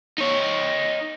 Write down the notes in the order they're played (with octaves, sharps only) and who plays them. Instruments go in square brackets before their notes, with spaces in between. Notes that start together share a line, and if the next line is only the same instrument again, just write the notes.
[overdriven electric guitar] D#4 C#5